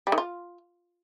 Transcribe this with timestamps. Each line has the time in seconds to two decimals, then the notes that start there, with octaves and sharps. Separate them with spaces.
0.07 G3
0.12 D#3
0.18 F4